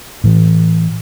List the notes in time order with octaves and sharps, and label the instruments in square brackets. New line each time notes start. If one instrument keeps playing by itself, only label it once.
[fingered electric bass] A2 E3